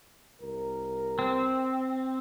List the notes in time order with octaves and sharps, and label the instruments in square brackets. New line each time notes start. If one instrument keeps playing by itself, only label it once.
[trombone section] C2 A#4
[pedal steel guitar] C4